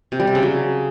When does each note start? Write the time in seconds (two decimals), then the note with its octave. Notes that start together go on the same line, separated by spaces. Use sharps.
0.12 C3
0.20 G3
0.27 C3
0.35 C#3
0.43 F#3